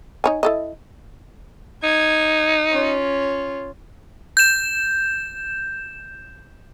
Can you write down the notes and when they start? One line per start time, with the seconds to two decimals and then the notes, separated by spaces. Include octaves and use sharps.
0.24 D#4 C#5 G#5
0.43 E4 A4 D#5
1.83 D#4 G#6
2.70 C#4 F4
4.37 G6 E7